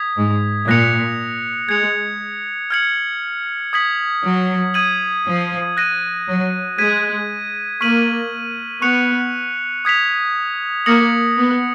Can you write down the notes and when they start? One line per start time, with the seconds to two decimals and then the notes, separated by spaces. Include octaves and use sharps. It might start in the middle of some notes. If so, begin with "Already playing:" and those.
Already playing: D#6 G#6 B6
0.17 G#2
0.67 A#2 F#6 A#6 C#7 F7
1.69 G#3 G#6 C#7 F7
2.71 F6 G#6 C#7 F#7
3.73 D#6 G#6 B6 F#7
4.24 F#3
4.74 D#6 G#6 D#7 F#7
5.26 F3
5.77 F#6 A#6 D#7
6.27 F#3
6.78 G#3 G#6 B6 D#7
7.81 A#3 C#6 F6 B6 D#7 F#7
8.82 B3 C#6 F#6 C#7 F7
9.85 D#6 G#6 B6 F7
10.86 A#3 D#6 A#6 C#7 F#7
11.37 B3